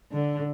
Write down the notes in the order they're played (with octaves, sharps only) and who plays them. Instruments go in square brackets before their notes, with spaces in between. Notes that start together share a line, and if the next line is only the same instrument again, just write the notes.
[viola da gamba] D3